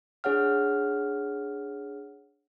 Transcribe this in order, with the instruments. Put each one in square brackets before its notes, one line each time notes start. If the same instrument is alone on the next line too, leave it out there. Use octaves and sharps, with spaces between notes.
[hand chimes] D4 G#4 C#5 F#5 F6